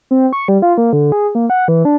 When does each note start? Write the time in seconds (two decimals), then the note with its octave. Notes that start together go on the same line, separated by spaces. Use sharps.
0.11 C4
0.33 C#6
0.48 G3
0.62 F4
0.78 A#3
0.93 D3
1.12 G#4
1.35 A#3
1.50 F#5
1.68 E3
1.85 D4